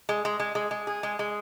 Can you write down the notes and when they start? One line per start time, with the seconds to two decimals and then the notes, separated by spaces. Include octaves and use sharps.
0.09 G#3
0.25 G#3
0.40 G#3
0.55 G#3
0.71 G#3
0.87 G#4
1.03 G#3
1.19 G#3